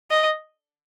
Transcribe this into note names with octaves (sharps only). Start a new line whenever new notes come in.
D#5